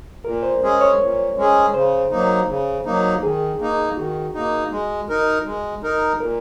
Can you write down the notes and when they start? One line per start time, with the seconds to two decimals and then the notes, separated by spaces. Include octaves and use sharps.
0.25 A#2 A#4
0.43 C5
0.62 G#3 C#4 G#4
0.81 C#5
0.99 A#2
1.37 G#3 C#4 G#4
1.74 C#3 C5
2.11 F#3 A#3 D#4
2.48 C#3
2.85 F#3 A#3 D#4
3.23 D#3 G#4
3.59 A#3 D#4
3.97 D#3 F#4
4.34 A#3 D#4
4.71 G#3
5.09 D#4 A#4
5.45 G#3
5.83 D#4 A#4
6.20 A#2 A#4